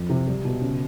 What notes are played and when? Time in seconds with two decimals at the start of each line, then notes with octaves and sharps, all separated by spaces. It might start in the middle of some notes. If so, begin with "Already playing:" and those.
Already playing: F2
0.09 C3
0.27 G3
0.44 B2
0.61 C#3